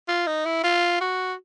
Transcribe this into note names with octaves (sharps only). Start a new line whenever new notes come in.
F4
D#4
E4
F4
F#4